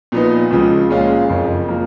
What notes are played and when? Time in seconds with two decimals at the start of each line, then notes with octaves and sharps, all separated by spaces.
0.12 A#2 F3 B3 D#4
0.51 C#2 C#3 F3
0.90 A#2 G#3 C#4 F4
1.29 F#1 F2 C#3
1.68 F3 A#3